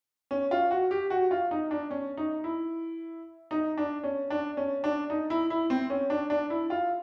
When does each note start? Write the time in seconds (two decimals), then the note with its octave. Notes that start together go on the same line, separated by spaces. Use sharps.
0.31 C#4
0.51 F4
0.71 F#4
0.91 G4
1.10 F#4
1.31 F4
1.51 D#4
1.71 D4
1.90 C#4
2.17 D#4
2.44 E4
3.51 D#4
3.78 D4
4.03 C#4
4.30 D4
4.57 C#4
4.84 D4
5.10 D#4
5.30 E4
5.50 E4
5.70 C4
5.90 C#4
6.10 D4
6.30 D4
6.50 E4
6.70 F4